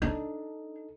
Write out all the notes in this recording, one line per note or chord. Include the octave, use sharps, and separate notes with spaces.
D4 D#4 A4